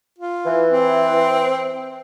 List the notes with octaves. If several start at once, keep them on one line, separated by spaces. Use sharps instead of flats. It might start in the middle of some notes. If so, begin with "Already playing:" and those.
F4
E3
C4